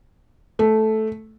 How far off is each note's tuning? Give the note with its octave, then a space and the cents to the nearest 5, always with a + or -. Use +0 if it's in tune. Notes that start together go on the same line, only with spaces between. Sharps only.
A3 -10